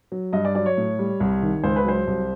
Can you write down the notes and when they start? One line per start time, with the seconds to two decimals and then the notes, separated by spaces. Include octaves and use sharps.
0.12 F#3
0.33 G2 D#5
0.45 D5
0.55 F#3 D5
0.66 C#5
0.77 A2
0.99 G3
1.20 C2
1.42 D#3
1.64 C#2 C5
1.76 B4
1.85 F#3 C5
2.07 C2